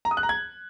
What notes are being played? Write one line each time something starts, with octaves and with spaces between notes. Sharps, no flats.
A#5
D#6
F#6
A#5
G#6